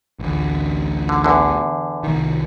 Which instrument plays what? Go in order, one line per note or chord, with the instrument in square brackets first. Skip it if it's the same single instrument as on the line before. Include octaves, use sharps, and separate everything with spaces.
[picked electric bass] A1 D2
[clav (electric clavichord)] D3
E2 A2 D3
[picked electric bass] C2 D#3